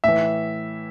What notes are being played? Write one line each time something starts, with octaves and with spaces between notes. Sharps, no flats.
A2 E3 E5